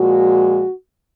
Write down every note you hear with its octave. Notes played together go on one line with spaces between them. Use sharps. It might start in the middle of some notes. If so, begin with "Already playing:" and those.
Already playing: A#2 F3 G#3 F#4